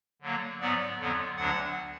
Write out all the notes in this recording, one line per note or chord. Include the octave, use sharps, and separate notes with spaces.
D3 F#3 A#3
G#2 F#3 B3 D5
F2 D3 F#3 B3
D2 D3 F#3 D4 F#5